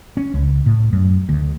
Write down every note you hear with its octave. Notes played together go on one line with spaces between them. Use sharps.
C#4
C#2
A2
F#2
D2